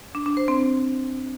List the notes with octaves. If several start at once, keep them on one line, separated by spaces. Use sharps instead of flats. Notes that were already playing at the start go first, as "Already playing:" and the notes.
D4
D4
C5
C4